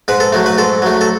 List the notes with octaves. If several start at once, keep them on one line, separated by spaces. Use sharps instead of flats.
G#2 B4
A4
F#3 A3
B4
G#2 A4
F#3 A3
A4